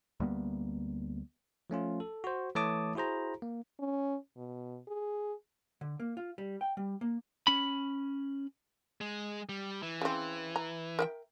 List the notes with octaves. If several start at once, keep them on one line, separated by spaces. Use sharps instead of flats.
D2 G3 A#3 B3
F3 A3 C#4 F4
A4
F#4 C5
E3 A3 C#5 A5 D6 D#6
E4 F#4 G#4 C5 A#5
A#3
C#4
B2
G#4
D3
A#3
F4
G3
G5
G3
A#3
C#4 B5
G#3
G3
E3
C#3 C4
A#5
A#4 E5 G5